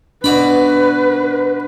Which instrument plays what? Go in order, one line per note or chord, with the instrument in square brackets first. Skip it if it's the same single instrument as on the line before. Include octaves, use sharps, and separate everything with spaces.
[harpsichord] B2 D5 B5 [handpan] D4 [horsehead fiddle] B4